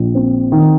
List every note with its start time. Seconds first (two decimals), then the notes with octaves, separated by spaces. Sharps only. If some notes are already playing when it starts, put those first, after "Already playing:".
Already playing: A#1
0.15 C4
0.52 D#3